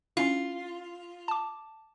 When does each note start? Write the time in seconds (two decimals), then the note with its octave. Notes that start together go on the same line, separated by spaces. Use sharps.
0.17 C#4 E4 F4
1.28 A5 D6